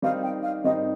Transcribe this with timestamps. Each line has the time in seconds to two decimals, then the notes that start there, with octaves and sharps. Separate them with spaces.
0.02 D#3 G3 C4 D#4 F5
0.23 G5
0.43 F5
0.64 D#3 G3 C4 D#4 D#5